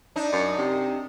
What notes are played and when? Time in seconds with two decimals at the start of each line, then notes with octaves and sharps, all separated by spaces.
0.16 D4 D#4
0.32 F#2
0.58 C3